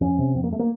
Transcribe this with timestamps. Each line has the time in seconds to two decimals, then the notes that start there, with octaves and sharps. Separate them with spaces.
0.01 F2 C#4
0.19 C3
0.35 F2 C4
0.44 A#3
0.52 A3
0.59 A#3